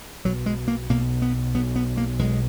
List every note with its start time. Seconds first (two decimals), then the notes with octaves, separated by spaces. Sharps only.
0.25 B1 B2 F#3
0.46 G#3
0.68 A#3
0.89 B1 B2 A#3
1.22 B3
1.54 B1 B2 B3
1.76 B3
1.97 A#3
2.19 B1 B2 G#3